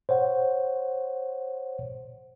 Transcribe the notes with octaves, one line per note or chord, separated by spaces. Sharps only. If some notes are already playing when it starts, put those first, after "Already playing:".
C5 C#5 F#5